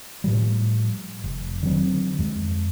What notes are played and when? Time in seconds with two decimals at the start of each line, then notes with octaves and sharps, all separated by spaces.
0.24 A2 F3 G3
1.24 F1
1.63 D3 D#3 F#3 C4
2.19 F2 G#3